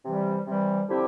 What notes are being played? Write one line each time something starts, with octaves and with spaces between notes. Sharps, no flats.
C3 E3 G3
C3 E3 G3
D3 F3 C4 E4 G4